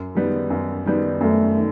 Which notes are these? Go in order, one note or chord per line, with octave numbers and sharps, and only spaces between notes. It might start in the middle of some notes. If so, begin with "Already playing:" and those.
Already playing: F#2
D#3 G3 B3
F#2
D#3 G3 B3
F#2 A3
D#3